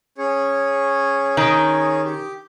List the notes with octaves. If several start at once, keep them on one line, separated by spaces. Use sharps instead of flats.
C#4 G#4 C#5
D#3
G4